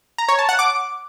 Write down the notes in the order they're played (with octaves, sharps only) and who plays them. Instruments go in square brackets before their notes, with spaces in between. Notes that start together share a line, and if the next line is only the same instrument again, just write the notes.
[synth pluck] A#5
C#5
A5
F#5
D6